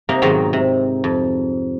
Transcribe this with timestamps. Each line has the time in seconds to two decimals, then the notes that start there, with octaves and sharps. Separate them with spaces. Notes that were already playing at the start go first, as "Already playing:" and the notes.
0.09 C3 A#3 D#4 A#4
0.22 G#2 B2 D#3 F#3 G5 A#5
0.53 C3
1.04 F2